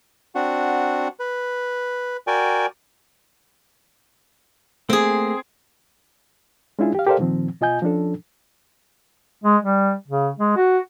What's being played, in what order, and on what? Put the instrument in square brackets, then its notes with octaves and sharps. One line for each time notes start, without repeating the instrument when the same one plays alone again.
[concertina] C4 D4 F#4 F#5
B4
F#4 A#4 D5 G5 G#5
[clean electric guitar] A3 A#3 [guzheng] C4 G#4
[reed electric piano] G#3 C#4 D4 E4 F4 G#4
G4 F5
G4 A4 A#4 C5 D5 F5
A#2 D#3 F3 C4
B2 F4 D#5 G#5 G6
F3 C#4 D4 A4
[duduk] G#3
G3
C#3
G#3
F#4